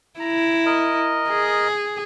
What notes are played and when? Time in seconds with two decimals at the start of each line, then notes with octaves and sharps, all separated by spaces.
0.20 E4 A#5
0.66 A#4 D#5
1.30 G#4